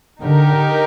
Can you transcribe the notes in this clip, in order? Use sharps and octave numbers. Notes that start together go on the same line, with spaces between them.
D3 D#4 G4 A#4